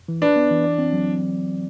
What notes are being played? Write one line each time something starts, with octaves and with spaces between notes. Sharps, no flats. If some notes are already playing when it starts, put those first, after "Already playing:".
E3
D4 B4
B3
E3
D5
C4
F#3